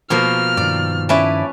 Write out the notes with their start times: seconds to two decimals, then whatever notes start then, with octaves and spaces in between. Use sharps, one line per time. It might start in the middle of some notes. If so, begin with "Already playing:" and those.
0.10 B2 F3 A#3 F6
0.57 G2 D#3 D5
1.09 C#4 E4 B4 D5 A5